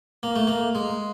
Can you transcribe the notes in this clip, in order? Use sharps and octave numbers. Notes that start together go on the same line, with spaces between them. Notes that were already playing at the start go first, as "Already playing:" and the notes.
A#3
A3
A#3
G#3